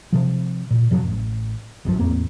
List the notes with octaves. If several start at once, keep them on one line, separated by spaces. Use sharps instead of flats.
C3 F3
A#2
F#2 C3 F3 F#3
A1
G#1 F#2 C3 F3
A1 E2 A#3 C4